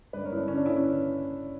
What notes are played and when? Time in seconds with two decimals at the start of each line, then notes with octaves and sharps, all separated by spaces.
0.13 G2 B4 D5
0.25 A#4 C#5
0.31 G2 E4
0.37 D4
0.48 D3 C#4
0.57 D4
0.65 D3 C#4 E4